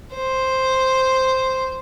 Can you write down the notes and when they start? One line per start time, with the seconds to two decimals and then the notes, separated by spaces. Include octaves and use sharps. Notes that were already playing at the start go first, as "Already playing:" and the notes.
0.14 C5